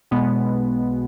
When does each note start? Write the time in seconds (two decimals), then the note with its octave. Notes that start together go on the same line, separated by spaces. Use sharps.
0.11 B1 B2 G#3 B3